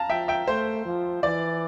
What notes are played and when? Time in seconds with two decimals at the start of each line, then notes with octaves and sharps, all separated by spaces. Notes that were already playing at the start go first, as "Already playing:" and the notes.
Already playing: F5 A5 A#5
0.09 F3 E5 G5
0.28 E5 G5
0.48 A3 C5
0.85 F3
1.23 E3 D5